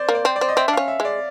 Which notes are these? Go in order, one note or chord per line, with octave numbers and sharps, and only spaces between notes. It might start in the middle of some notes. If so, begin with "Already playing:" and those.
Already playing: C5 D5
A#3
D5
C4
D5
C4
D#5
C4 E5
D4
C#4 F5
E5
G#3
D5